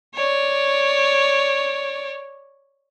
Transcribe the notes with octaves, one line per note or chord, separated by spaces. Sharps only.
C#5 D5